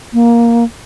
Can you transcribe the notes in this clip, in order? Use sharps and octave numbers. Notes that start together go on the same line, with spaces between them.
A#3